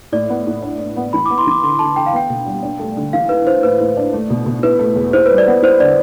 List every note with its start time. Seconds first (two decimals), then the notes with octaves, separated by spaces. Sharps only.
0.12 A2 D5
0.29 B3
0.47 A2
0.62 D4
0.79 D4
0.96 B3
1.13 E3 B5
1.26 D6
1.30 B3
1.38 C6
1.47 E3 D6
1.63 D3 C6
1.79 D3 A5
1.96 D3 G5
2.06 F5
2.13 B3 G5
2.30 B2
2.46 G3
2.63 D4
2.79 A3
2.97 D3
3.13 E3 F5
3.29 E4 B4
3.47 E4 C5
3.63 A2 B4
3.80 A2
3.97 D4
4.13 A3
4.30 B2
4.46 B2
4.63 E4 B4
4.79 A3
4.96 E2
5.13 E4 C5
5.26 B4
5.30 G3
5.38 D5
5.47 B3
5.62 E4 C5
5.80 D3 D5